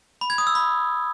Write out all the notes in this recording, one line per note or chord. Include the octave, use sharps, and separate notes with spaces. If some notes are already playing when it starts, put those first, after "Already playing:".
B5
G#6
D#6
E6
B5